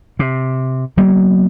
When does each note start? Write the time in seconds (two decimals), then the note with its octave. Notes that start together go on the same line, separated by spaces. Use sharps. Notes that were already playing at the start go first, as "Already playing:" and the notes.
0.19 C3
0.97 F#3 A#3 B3